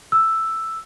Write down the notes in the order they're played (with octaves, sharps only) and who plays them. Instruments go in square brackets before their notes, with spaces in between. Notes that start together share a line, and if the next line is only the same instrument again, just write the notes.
[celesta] E6